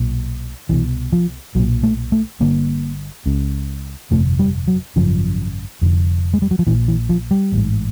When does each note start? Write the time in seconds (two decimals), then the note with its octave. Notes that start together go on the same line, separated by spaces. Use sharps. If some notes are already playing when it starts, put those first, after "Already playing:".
Already playing: B1 A#2
0.69 C2 B2 E3
1.12 F3
1.55 B1 F#3
1.59 A#2
1.83 A3
2.12 A3
2.40 G1 G2 D3 A#3
3.26 C#2 C#3
4.11 G1 F2 C3 A3
4.39 G3
4.68 F#3
4.96 G#1 F#2 C#3 F3
5.82 F1 F2 D3
6.33 G#3
6.42 G3
6.51 F#3
6.59 F3
6.67 A#2 E3
6.69 A#1
6.88 E3
7.09 F3
7.31 G3
7.52 A1 G#2